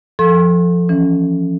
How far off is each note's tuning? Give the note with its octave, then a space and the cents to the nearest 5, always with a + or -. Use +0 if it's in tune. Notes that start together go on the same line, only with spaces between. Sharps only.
F3 +0 A4 +0 C6 +45
E3 +0 C#4 +0